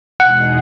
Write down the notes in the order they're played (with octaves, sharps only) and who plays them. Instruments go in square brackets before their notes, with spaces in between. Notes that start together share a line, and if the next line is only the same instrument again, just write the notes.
[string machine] E2 B2 G#3 D#4 G#4 [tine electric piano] F#5